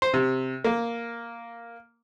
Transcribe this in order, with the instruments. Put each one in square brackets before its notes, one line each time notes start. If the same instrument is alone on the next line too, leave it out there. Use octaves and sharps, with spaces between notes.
[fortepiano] C5
C3
A#3